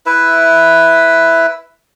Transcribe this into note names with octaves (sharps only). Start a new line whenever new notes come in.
E4 B4 E5